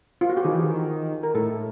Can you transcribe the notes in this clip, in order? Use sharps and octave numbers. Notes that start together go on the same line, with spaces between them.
F4
F#4
G4
D#3 G#4
E3
D#3
A#4
A2 A4